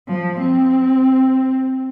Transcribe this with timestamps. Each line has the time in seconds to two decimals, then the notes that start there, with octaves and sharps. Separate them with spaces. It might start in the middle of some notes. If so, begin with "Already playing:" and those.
0.08 F3
0.41 C4